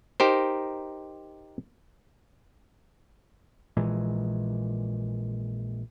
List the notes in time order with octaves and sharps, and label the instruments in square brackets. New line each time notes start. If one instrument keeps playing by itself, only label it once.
[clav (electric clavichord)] D#4 G4 A#4 C5
[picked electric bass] A#1 A#2 E3 G#3